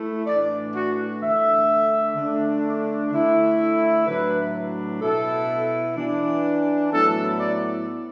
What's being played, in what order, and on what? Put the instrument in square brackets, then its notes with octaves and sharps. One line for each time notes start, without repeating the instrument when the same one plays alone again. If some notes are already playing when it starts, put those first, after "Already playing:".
Already playing: [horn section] A3 E4
A2 E3 D4 D5
F#4
D3 A3 D4 E5
D3 A3 D4
D3 A3 E4
A2 F#3 D4 B4
B2 B3 E4 A4
E3 D4
A2 F#3 B3 E4 A4
D5